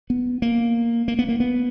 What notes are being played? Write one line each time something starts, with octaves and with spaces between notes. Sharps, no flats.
B3
A#3
A#3
B3
A#3
B3